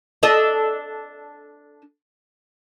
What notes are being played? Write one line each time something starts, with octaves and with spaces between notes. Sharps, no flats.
D4 A4 D#5